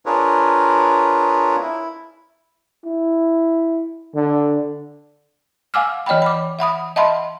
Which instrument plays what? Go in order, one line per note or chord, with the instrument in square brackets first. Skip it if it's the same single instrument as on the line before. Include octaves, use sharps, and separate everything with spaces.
[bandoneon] D4 F4 G#4 A#4 B4 C#5
E4
[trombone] E4
D3
[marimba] F5 F#5 G#5 D6 E6 F6
E3 C#5 D#5 F#5 G5 B5
B5 D6
E5 F#5 B5 D#6
D#5 E5 F#5 A5 B5 C6